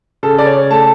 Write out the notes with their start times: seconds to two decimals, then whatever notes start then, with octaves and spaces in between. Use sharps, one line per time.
0.23 C#3 A4
0.38 D5
0.46 C#5
0.71 A3 A5